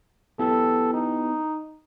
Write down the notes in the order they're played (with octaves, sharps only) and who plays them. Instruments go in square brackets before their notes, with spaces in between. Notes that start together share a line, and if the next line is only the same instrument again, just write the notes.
[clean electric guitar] B3 E4 G4 [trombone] A4
[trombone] D#4